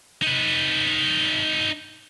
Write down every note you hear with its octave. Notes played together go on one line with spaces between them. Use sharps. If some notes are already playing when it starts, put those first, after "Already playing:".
D#4 B4